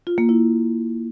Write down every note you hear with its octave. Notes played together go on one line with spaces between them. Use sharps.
F4
A#3
E4